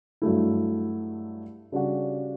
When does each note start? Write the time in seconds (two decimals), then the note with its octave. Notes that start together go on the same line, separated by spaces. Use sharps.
0.22 G2 F#3 A3 E4
1.72 C#3 G3 D4 F#4